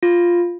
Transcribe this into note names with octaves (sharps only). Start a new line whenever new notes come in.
F4